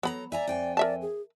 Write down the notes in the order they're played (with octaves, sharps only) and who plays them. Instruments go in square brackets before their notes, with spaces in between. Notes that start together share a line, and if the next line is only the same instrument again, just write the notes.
[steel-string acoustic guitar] F#3 A4 A#5 [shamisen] B3 B5
[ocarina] D5 [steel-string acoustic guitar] E5 G#5 A#5
[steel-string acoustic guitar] F2 G5 G#5
[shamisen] A#4 E5 A5 [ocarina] D5
[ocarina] G#4